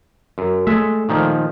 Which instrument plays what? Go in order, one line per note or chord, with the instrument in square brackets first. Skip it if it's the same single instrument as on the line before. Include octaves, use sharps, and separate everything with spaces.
[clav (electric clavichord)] F#2
[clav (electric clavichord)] G#3 E5 [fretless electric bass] A3
[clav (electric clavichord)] A#2 D#3 F3